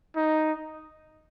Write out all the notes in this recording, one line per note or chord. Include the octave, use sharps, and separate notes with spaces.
D#4